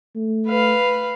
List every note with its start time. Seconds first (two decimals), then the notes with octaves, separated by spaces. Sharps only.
0.15 A3
0.47 B4 F5